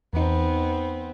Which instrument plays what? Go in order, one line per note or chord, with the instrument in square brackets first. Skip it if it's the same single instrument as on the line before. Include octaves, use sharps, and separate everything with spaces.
[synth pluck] E2 D#4 [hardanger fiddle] B3 C4